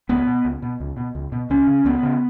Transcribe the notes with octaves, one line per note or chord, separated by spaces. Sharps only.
C#2 B3
B2
C#2
B2
C#2
B2
C#2
B2
C#2 C#4
C#3
C#2 B3
C#3